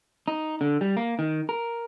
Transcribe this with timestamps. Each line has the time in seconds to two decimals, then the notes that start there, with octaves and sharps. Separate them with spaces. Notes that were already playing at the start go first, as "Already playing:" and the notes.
0.28 D#4
0.61 D3
0.81 G3
0.97 A#3
1.19 D#3
1.49 A#4